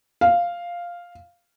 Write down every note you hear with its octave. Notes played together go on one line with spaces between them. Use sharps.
F5